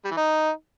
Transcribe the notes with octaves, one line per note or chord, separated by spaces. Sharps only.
G3
E3
D#4